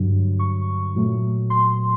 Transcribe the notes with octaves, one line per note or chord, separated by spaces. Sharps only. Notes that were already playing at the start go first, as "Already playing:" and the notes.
Already playing: G2 D3 F#3
C#6
A#2 F#3 A3
C6